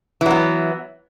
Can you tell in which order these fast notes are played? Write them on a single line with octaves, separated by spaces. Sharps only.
E3 F#3 B3